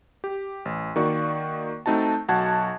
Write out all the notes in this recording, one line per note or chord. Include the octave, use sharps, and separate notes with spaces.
G4
A1
D#3 A#3 F#4 D5 C#6
A3 C4 D#4 F#4 A5
B1 F#4 F#5 A5 G#6